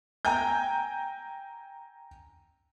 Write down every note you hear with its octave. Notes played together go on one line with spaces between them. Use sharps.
G5 G#5 A#5 G6